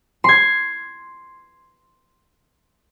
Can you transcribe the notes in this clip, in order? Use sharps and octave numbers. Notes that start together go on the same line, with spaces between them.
C6 G#6